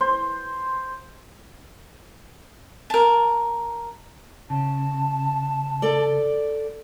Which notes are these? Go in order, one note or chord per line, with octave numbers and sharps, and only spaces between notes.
C5
A#4 A5
C#3 A5
A4 D5